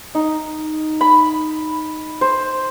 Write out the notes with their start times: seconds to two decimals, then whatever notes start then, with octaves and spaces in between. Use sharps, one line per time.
0.15 D#4
1.01 B5
2.21 C5